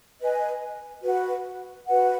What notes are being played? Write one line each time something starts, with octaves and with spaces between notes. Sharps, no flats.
B4 D#5 G#5
F#4 B4 F#5
F#4 B4 F#5